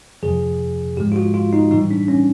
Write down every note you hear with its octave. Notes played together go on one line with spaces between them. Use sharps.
F2 C3 F3 G#4
G#2 F3 G#3 G4
F4
F#4
F4
D#4
A2 E3 G3 D#4
D4
C#4